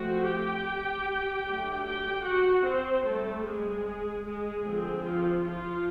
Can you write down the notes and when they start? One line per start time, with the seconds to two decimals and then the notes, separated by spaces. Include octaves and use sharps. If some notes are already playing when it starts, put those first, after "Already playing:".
Already playing: F3 A3 C4 F#4 F#5
0.24 G4 G5
1.44 F#3 A3 D4
1.85 G4 G5
2.24 F#4 F#5
2.64 C4 C5
3.05 G3 A3 C4 A4
3.44 G#3 G#4
4.25 G#3 G#4
4.65 D3 F3 G#3 C4
5.04 F3 F4
5.44 F3 F4